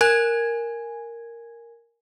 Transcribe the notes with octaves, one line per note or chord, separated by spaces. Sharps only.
A#4 G#5 G#6